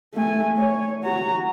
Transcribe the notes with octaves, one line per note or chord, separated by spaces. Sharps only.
A3 G#5
C#5
F#4 A#5